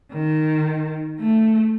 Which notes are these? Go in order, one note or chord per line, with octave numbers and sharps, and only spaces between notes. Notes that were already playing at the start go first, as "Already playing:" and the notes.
D#3
A3